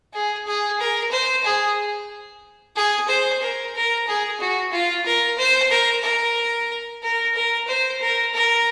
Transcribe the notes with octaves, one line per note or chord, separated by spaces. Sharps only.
G#4
G#4
A#4
C5
G#4
G#4
C5
A#4
A#4
G#4
F#4
F4
A#4
C5
A#4
A#4
A#4
A#4
C5
A#4
A#4